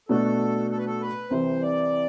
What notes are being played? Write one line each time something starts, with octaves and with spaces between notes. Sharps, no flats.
B2 A3 D4 F#4 A4
A4
B4
A4
B4
C2 C3 E3 C5
D5